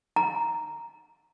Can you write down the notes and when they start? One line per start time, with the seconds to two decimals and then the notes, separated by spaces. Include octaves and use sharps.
0.16 A#5